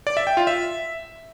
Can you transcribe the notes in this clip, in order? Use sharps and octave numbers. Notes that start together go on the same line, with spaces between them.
D5
E5
G5
F4
E5